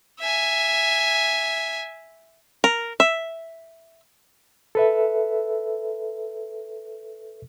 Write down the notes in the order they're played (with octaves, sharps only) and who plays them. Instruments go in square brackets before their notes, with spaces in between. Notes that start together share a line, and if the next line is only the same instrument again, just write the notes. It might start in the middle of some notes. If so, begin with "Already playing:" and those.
[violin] E5 G#5
[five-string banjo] A#4
E5
[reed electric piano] A4 B4 E5